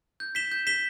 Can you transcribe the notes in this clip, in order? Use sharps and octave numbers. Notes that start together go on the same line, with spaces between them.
G6
B6 E7 G7
G6
B6 E7 G7